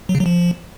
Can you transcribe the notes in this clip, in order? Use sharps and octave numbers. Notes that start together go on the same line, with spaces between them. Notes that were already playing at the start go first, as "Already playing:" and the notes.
F#3
C#3
F#3
F3